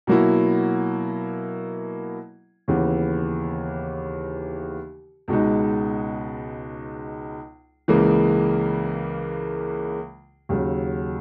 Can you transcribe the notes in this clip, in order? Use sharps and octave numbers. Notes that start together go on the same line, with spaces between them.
B2 F#3 A#3 E4
D#2 C#3 E3 B3
C#2 B2 G#3 D#4
C#2 C#3 E3 A#3
D#2 C#3 F#3